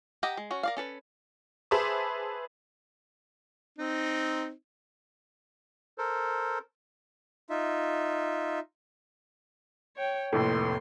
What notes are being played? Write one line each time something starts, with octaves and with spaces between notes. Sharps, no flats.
G4 D#5 F#5 G5 A#5
G#3
C#4 F#4
A#4 D5 F5
C#4 A4 B4
G#4 B4 C5 E5 A5 D6
C4 D#4
A4 A#4 C5
D#4 F4 E5
C#5 G5
F1 F2 A2 A#3 A4 C6